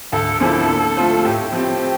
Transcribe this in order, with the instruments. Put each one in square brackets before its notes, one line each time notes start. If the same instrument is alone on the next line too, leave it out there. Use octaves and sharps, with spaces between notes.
[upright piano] D2 [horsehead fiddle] A4
[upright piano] D3 F3 A#3 E4 [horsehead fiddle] A4
[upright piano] D3
A3 C4 F4 C5
[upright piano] A2 [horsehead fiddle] G4
[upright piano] F3 C4 [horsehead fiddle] G4